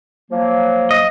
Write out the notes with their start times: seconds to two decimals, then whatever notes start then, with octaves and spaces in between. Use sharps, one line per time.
0.31 F3 F#3 A#3
0.91 D#5